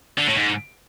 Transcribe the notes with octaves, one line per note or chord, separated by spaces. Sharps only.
D3
A2
G#2